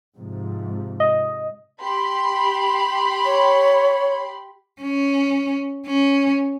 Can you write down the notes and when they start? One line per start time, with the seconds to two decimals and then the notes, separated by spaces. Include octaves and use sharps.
0.17 G#2 C3 F3
1.00 D#5
1.82 G4 B5 C6
3.25 C#5
4.82 C#4
5.87 C#4